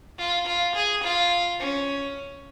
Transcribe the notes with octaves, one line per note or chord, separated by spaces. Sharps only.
F4
F4
G#4
F4
C#4